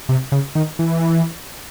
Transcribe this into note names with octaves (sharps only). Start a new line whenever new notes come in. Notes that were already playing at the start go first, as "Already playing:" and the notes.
C3
C#3
D#3
E3